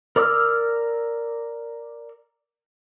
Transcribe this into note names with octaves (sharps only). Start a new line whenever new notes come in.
A#4 D5 D6 E6 F6